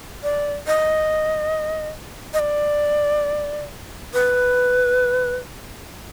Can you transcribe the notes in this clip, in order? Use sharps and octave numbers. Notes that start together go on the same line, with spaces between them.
D5
D#5
D#5
D5
B4